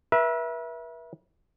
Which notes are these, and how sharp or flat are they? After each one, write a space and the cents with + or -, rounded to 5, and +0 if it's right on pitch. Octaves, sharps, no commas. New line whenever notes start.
B4 -40 E5 +0